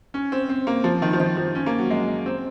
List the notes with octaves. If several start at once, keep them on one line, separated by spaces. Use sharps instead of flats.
C#4
C4
C4
A#3
F3
D#3
F3
D#3
F3
C#4
A#3
F#3
G#3
C4